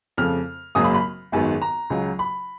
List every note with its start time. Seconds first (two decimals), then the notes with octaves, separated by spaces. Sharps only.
0.17 F2 C#3 F3 A3 F6
0.75 G#1 F#2 C#3 F#3 A#3 D#6
0.84 B5
0.94 B5
1.32 G#1 F#2 D#3 G#3 B3
1.62 A#5
1.90 C#2 C#3 F#3
2.19 B5